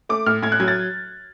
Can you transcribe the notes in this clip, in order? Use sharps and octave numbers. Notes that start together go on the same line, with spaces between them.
A3 D6
A2 F6
A2 G#6
F#6
F#3 G#6
A6